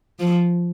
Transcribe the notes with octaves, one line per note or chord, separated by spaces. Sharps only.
F3